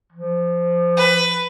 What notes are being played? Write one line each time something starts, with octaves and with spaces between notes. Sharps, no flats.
F3
B4